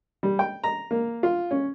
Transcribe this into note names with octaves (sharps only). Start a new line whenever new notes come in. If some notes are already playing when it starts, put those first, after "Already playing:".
G3
G5
A#5
A#3
F4
C#4